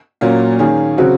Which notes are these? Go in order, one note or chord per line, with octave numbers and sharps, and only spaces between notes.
A#2 F#3 A#3 C#4
D#3 A#3 C#4 G#4
C#3 F#3 C4 F#4